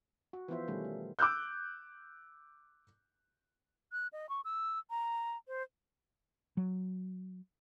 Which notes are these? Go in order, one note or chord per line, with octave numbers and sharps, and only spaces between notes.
F#4
E3 F3 B3 F4 C5 E5
B2 D#3 E3 G3 A3 C#4
A3
D6 E6 F#6 G6
F#6
D#5
C#6
E6
A#5
C5
F#3